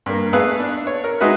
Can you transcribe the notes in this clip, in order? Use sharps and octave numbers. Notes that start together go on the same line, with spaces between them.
G2 A#3
A3 B3 G#4 A4 B4 F5
D4
C#5
A#4
G#3 D#4 F#4 G#4 B4 E5